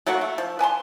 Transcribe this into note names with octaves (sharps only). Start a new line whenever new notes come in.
F#3 A3 A#3 F#4
A3
F3
B4 G#5 A5 C6